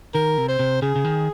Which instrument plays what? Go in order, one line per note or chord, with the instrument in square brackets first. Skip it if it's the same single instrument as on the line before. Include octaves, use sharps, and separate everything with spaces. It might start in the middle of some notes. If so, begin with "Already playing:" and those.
[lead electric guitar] D#3 [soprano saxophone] A#4
[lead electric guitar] C3
[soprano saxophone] C5
[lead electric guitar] C3
[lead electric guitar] C#3 [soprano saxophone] G#4
[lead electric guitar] C#3
D#3